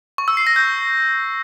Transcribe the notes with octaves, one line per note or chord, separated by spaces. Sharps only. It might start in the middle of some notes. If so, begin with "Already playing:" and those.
C#6
E6
C7
A#6
G6